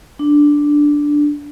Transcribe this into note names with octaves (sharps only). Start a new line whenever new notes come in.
D4